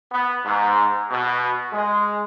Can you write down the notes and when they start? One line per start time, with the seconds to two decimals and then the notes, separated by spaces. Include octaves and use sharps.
0.12 B3
0.45 G#2
1.11 B2
1.72 G#3